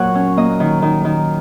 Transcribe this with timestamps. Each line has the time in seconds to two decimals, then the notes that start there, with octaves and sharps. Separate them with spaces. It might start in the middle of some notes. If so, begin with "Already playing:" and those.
Already playing: A#2 F#3 C#5 F#5
0.15 C#4
0.37 A#3 D#5
0.60 D#3
0.82 D#3
1.05 D#3